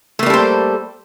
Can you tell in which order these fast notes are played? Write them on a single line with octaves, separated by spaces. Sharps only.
A3 A#3 G3 A4 C5